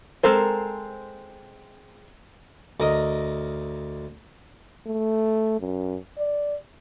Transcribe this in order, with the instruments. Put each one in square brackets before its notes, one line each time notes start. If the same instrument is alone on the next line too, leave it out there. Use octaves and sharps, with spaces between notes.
[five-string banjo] G#3 C4 A4 A#4 C5
[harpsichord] D2 A#4 D#5
[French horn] A3
F#2
D5